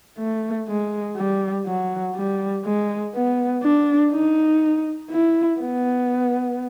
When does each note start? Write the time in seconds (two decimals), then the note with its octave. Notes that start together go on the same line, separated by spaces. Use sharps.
0.18 A3
0.68 G#3
1.17 G3
1.66 F#3
2.15 G3
2.65 G#3
3.14 B3
3.63 D4
4.12 D#4
5.10 E4
5.60 B3